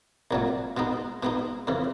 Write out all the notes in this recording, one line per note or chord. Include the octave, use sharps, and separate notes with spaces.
C2 A#2 F#3 A3
B2 G#3 B3 D#4
B2 G#3 B3 D#4
F2 C#3 E3